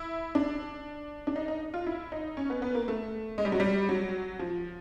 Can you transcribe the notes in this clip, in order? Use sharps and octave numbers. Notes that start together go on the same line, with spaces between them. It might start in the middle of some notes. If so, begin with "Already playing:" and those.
Already playing: E4
D4
D4
D#4
D#4
F4
E4
D#4
C#4
B3
B3
A#3
A3
G#3
G3
F#3
G3
F#3
F3